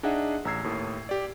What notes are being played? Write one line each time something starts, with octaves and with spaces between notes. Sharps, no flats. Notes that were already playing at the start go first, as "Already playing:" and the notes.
D4 D#4 G#4 D#5 E5 F#5
A1 A#5 E6 G#6 C7
D#2 A2
G4 D5